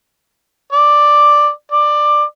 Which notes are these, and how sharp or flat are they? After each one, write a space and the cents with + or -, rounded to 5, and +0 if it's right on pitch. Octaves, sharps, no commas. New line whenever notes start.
D5 +5
D5 +15